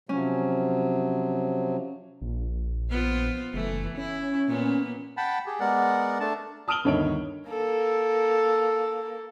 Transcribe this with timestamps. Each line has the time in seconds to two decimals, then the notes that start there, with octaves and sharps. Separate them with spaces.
0.09 C3 F3 F#3 C#4
2.21 A#1
2.90 B3 F4 C5
3.54 F#1 E3 A3
3.97 C#4 E4
4.47 A#2 A#3 B3
5.17 F#5 G5 A5 B5
5.46 G4 G#4
5.60 G#3 B3 A#4 D5 F#5
6.20 A3 D4 A5
6.68 A5 D#6 F6 D7 F#7 G7
6.84 G1 D2 D#3 C#5 D#5 D7
7.49 A#3 A4